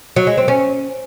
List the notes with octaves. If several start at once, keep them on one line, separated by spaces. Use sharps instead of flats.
F#3
G#3
C4
C#4